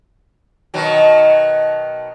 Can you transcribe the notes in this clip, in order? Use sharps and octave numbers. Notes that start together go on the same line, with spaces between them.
B2 D#3 F#3